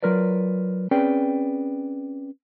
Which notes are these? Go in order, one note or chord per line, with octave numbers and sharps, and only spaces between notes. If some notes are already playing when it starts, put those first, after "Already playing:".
F#3 F4 A#4 B4 D5
C4 C#4 G#4 B4 D5 G5